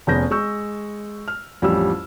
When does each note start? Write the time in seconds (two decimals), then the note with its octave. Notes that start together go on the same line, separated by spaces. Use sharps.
0.07 F1 B3 C#4 G#4 G6 A#6
0.31 G#3 C#6 E6 G6
1.28 F6
1.62 A1 F2 G3 C#4 G4 E6